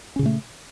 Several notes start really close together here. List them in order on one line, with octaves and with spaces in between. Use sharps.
C#4 C#3 A#2 A3